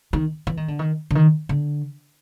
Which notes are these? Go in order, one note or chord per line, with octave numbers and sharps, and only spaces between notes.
D#3
E3
D#3
D3
D#3
D3
D#3
D3